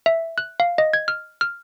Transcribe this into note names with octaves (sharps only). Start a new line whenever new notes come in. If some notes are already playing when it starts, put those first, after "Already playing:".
E5
F#6
F5
D#5
G#6
F6
F6